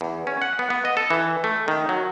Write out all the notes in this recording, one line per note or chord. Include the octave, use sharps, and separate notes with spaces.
E2
C#4
F#5
B3
B3
D#5
A4
E3
A3
D#3
F#3